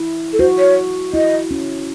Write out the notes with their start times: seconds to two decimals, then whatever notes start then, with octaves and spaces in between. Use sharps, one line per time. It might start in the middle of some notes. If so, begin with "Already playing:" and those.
Already playing: E4
0.33 A4
0.39 F#4 C5
0.58 C#5
1.14 E4 D#5
1.51 C#4